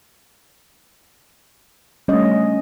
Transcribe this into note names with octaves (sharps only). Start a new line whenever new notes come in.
G3 A3 C#4 D4 D#5